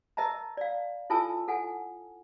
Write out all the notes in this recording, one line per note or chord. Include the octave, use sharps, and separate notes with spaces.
A#4 D#5 E5 A5 A#5
D5 F5
E4 F4 A4 G#5 A5 E6
A4 F#5 G#5